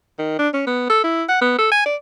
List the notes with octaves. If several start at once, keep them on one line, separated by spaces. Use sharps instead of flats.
D#3
D4
C#4
B3
A4
E4
F#5
B3
A4
G#5
D5